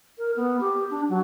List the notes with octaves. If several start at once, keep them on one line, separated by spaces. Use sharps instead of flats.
A#4
B3
G4
D4
F#3